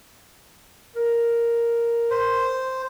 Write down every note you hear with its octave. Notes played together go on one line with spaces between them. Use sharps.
A#4
C5